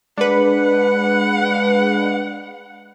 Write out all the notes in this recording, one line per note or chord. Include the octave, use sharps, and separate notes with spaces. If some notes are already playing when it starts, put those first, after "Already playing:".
G#3 D4 B4 F#5